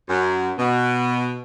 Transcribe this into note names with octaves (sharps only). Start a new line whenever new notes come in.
F#2
B2